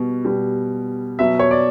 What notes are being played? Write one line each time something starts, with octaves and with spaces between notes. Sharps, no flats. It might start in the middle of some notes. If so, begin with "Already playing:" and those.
Already playing: B2 G3
B2 G3
B2 F#3 E5
C#5
D5